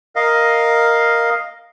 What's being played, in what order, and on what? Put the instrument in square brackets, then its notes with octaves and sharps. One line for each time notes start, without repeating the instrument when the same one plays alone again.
[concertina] A#4 D#5 F5